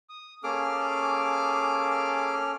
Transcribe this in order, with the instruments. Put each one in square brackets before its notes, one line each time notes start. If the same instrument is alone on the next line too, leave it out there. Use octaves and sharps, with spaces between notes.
[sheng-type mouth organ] D#6
[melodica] A#3 G#4 D6 [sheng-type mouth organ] C#4 A4 F6